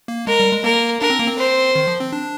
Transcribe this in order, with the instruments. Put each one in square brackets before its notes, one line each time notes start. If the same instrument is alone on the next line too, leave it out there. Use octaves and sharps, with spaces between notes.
[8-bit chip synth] A#3
[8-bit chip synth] G#3 [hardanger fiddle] A#4
[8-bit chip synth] G3
G#3
[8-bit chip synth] A#3 [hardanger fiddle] A#4
[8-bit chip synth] D4 [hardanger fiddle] A#4
[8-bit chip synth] C4
A#3
C4
[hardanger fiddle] C5
[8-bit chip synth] D#3
F3
C4
D4